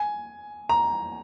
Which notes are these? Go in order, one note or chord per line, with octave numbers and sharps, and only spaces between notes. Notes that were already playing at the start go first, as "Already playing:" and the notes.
Already playing: G#5
A#5